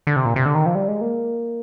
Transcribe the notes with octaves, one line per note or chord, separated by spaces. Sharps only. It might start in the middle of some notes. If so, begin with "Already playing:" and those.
D3
C3
A#2
C3
D3
D#3
F3
G3
G#3
A#3